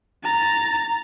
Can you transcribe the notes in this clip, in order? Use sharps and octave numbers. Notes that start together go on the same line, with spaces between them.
A#5 A6